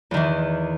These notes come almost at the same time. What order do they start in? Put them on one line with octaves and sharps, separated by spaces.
E2 D#3 E3